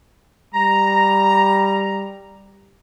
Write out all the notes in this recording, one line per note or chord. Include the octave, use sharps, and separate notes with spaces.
G3 A#5